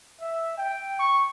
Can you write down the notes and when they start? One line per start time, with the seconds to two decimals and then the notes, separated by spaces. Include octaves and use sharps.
0.20 E5
0.57 G5
0.99 C#6